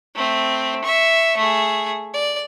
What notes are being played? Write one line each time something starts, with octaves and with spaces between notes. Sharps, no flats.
A3 C4
E5 C#6
A3 G#4
D5